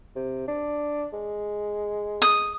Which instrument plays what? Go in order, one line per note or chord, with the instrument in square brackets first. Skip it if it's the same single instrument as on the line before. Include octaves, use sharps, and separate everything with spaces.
[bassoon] C3
D4
G#3
[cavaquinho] D#6